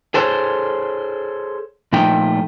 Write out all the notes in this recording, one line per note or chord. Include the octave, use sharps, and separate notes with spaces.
G#4 A4 C5 C#5
A#2 F3 A3 D#4 G5